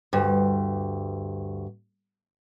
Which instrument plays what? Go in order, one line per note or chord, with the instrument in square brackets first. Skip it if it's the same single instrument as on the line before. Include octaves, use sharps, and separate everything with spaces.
[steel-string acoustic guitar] D2 G2